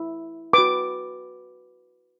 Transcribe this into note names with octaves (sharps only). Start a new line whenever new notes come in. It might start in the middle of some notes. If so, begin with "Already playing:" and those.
Already playing: E4
F#4 B4 D6